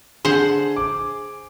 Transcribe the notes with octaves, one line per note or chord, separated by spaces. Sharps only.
D3 G#4 C5 F#5
D6